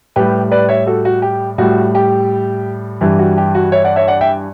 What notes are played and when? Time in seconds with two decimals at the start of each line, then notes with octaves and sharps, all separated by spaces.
0.16 A2 G3 G4 B4
0.52 B4 D5
0.69 C#5 E5
0.87 F#4 A4
1.05 F#4
1.22 G4
1.58 A2 G3 F#4
1.95 G4
3.01 G2 E3 G3 G4
3.19 F#4
3.38 G4
3.55 F#4
3.72 C#5 E5
3.84 D5 F#5
3.96 C#5 E5
4.08 D5 F#5
4.21 E5 G5